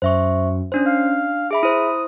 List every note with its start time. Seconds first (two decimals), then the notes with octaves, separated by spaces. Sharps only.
0.02 F#2 C5 E5 C#6
0.72 C#4 D4 C5
0.86 D4 F5
1.51 G#4 E5 B5 D6
1.63 E4 C5 D#6